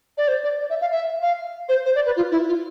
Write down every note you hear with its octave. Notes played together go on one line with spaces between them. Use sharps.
D5
C5
D5
D5
E5
F5
E5
F5
C5
C5
D5
B4
F4
E4
F4